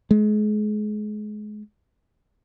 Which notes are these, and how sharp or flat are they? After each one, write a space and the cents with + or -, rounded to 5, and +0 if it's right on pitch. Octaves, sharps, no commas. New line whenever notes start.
G#3 +30